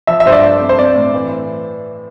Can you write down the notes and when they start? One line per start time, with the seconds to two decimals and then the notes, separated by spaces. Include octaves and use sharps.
0.07 F3 E5
0.20 E5
0.25 G2 C5
0.32 D5
0.43 A3
0.61 C4
0.69 C5
0.78 C4 D5
0.95 A2
1.14 E3